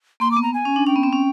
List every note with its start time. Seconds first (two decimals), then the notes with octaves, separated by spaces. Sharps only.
0.20 A#3 C6
0.31 D6
0.37 B3
0.43 A#5
0.54 G#5
0.65 C#4
0.76 D4
0.87 C#4 G5
0.96 B3
1.03 C4
1.13 C#4